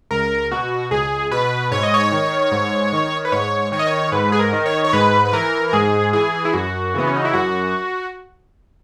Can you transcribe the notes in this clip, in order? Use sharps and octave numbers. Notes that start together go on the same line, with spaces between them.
C#2 A#4
B2 F#4
C#2 G#4
B2 B4
G#2 C#5
D#5
C#5
D#3
G#2
D#3
B4
G#2 C#5
D#3 C#5
D#5
C#5
G#2 B4
G#4
A#4
D#3
C#5
C#5
G#2 B4
B4
E3 A#4
A#4
G#2 G#4
E3 G#4
E4
F#2 F#4
C#3 E3 B3
C#4
D#4
E4
F#2 F#4